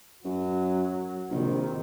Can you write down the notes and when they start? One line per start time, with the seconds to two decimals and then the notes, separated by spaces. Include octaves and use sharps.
0.25 F#2 F#3
1.31 A#1 C3 D#3